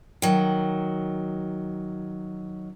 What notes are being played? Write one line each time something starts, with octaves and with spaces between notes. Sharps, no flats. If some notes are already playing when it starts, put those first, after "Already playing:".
D#3 F#3